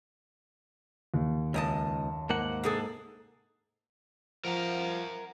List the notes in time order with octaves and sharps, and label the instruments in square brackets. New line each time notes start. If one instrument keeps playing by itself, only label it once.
[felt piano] D#2
[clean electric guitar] C#2 [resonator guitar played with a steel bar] F#2 D#5 A5
[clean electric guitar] G#2 A#3 F#5
[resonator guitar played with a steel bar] C3 G#4 A4
[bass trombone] F3 [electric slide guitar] A#4 F#5 A#5